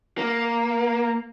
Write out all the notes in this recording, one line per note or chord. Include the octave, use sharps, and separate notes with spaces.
A#3